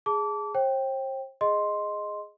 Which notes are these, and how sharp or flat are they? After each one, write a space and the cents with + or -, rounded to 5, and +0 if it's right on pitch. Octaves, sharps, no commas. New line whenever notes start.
G#4 +0 A5 +0 D6 -25
C5 +40 G5 +0
G#4 +0 D#5 +0 C6 +0